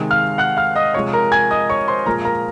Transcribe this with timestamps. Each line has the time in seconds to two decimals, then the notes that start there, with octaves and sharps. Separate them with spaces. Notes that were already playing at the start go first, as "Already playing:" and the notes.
Already playing: C3 D#3 G#3
0.11 F5 F6
0.38 F#5 F#6
0.57 F5 F6
0.76 D#5 D#6
0.94 C3 F3 G#3 C#5 C#6
1.13 A#4 A#5
1.32 G#5 G#6
1.51 D#5 D#6
1.70 C#5 C#6
1.88 C5 C6
2.06 A#2 F3 G#3 A#4 A#5
2.24 A#4 A#5